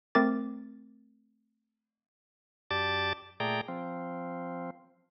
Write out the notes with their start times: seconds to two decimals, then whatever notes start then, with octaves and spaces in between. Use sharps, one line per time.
0.15 A3 C4 A#4 D6 A6
2.71 F#2 G4 D5 A5 D6 A6
3.40 A#2 A3 G#4 D5 G5 A#5
3.68 F3 C4